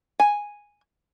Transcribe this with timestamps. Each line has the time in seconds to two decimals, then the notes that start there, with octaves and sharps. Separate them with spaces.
0.20 G#5